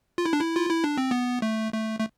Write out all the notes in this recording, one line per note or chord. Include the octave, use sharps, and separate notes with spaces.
F4
E4
D4
E4
F4
E4
D4
C4
B3
A3
A3
A3